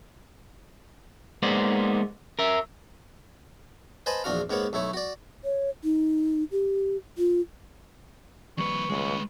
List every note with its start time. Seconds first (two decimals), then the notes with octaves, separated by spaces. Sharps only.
1.43 G#3 A#3 B3 D#4 C5 D5
2.39 A#4 E5
4.06 B4 C5 D#5 G#5 A5 B5
4.24 A#1 E2 D4 F#4 F5
4.50 G#2 A#3 B3 C#5 F#5
4.73 B1 A3 E4 C#5
4.93 F#4 D5
5.44 C#5
5.84 D#4
6.52 G4
7.18 F4
8.58 F2 D#3 G3 A#3 B4 C#6
8.90 C#2 G#3 B4